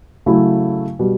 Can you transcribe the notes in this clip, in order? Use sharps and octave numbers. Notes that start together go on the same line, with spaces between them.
C#3 F#3 A3 E4
B2 G3